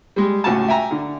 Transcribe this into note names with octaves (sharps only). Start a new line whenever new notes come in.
G3 G#3
C#2 A2 F#4 G#5 A5
E5 G5 G#5 A#5
D3